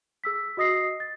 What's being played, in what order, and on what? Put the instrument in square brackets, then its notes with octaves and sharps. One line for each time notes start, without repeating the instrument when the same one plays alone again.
[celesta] G#4 E6 B6
F#4 D#5 D#6 A#6 C7
A6